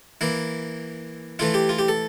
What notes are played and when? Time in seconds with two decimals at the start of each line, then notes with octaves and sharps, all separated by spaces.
0.21 E3 A#3 E4
1.39 E3 A3 E4 F4
1.54 G4
1.69 F4
1.79 G4
1.88 A4